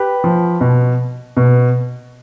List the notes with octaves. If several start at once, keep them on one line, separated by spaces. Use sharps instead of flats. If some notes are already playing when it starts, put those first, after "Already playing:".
Already playing: G4 B4
F3
B2
B2